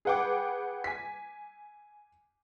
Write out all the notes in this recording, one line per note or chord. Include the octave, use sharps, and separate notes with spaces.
G#4 B4 F#5 G5 D6
G#5 B6